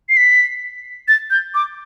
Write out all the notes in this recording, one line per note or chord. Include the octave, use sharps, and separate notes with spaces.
C7
B6
A6
G6
D6